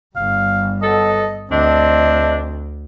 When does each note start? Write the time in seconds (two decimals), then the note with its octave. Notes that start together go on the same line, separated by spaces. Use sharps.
0.16 G1 G3 F5
0.82 B2 F#3 A4 D#5
1.51 D2 A3 C4 D4 D#5